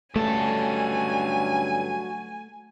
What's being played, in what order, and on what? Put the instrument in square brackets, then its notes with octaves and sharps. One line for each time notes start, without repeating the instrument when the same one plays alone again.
[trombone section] G2 D3 C#4 [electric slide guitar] F#3 A4 A5 [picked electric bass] A3 [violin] G#5